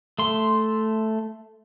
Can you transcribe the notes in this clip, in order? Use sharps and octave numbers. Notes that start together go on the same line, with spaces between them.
A3 C6